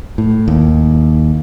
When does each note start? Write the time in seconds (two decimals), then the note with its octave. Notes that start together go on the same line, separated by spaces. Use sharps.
0.18 A2
0.48 D#2